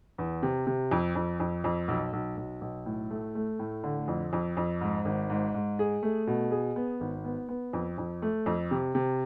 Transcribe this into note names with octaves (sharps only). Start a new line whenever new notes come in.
E2
C3
C3
F2
F2
F2
F2
B1
B1
B1
B1
A2
A3
A3
A2
D3
F2
F2
F2
G#2
G#1
G#2
G#2
G#4
A3
B2
G#4
B3
G#1
B3
B3
F2
F2
A3
F2
C3
C3